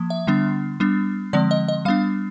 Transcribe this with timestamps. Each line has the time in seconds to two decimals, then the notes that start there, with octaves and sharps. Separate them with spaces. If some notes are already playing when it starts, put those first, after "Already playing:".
Already playing: F3 A#3
0.10 E5
0.27 D3 G3 B3 D4
0.80 G3 B3 D4
1.33 D3 F3 G#3 C4 D5
1.51 D#5
1.68 D#5
1.85 G3 B3 D4 F5